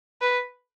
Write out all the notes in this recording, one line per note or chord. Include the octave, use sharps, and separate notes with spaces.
B4